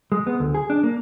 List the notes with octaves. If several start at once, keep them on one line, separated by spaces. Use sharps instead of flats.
G#3
B3
D2
G#4
D4
A#3